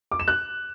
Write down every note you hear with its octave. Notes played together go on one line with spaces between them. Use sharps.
D6
E7
F#6